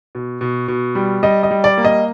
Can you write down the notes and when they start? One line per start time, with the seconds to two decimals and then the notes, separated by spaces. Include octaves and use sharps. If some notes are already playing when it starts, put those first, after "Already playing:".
0.15 B2
0.41 B2
0.68 B2
0.95 G3
1.23 G3 D#5
1.43 D#5
1.51 G3
1.64 D5
1.77 A#3
1.85 D#5